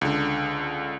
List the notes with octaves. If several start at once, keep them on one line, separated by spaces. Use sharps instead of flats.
C#2 D3